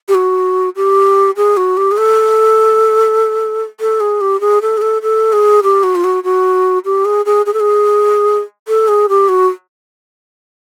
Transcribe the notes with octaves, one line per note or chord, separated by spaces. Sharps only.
G4
F#4
G4
G#4
F#4
G4
G#4
A4
A4
G#4
G4
G#4
A4
G#4
A4
A4
G#4
G4
F#4
F4
F#4
F#4
G4
G#4
G#4
G#4
A4
G#4
A4
G#4
G4
F#4